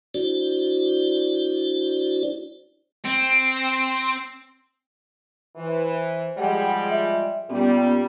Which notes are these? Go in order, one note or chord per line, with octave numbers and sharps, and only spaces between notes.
D4 E4 F#4 C5 D5
C4
E3 C5
F3 G3 G#3 G#4 F#5 G5
E5
A#2 G3 B3 C#4